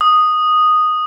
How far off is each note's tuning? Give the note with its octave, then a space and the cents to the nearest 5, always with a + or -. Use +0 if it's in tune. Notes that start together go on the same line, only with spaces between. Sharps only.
D#6 -5